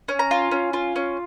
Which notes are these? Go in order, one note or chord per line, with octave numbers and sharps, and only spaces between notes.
C#4
A#5
F4
C#4
F4
C#4